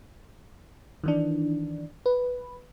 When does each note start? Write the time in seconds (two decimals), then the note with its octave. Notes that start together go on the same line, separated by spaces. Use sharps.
1.04 D#3 E3 D4
2.06 B4